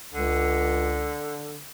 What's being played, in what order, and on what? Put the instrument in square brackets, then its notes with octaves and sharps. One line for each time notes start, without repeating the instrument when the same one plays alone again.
[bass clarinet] C#2 [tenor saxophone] D3